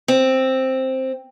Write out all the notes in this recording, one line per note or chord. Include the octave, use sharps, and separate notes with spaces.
C4